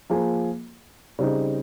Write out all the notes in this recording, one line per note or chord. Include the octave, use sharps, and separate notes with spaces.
F3 A#3 F4 G#4
C#3 G3 C4 D#4